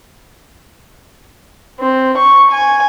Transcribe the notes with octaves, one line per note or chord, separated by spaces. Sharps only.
C4
C#6
G#5